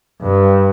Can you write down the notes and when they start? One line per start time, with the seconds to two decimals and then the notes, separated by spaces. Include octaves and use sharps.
0.23 G2